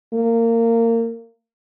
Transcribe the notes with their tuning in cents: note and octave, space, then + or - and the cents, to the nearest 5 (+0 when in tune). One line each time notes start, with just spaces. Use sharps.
A#3 -25